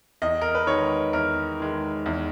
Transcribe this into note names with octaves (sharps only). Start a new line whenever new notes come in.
E2 D#5
A#4
B4
D#3 G#3 C#5
E2 A#4
D#3 G#3
E2